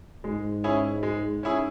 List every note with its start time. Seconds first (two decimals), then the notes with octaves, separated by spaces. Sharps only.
0.24 G#2 G#3
0.64 C#4 E4 G#4
1.03 G#3
1.43 C#4 E4 G#4